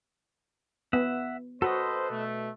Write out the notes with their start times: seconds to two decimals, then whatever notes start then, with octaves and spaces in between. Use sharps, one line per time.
0.93 B3 E5 F#5
1.62 F#4 A4 B4 C5 D#5
2.11 B2 A3